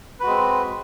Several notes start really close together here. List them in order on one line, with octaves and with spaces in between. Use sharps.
B4 F#4 G#3 C4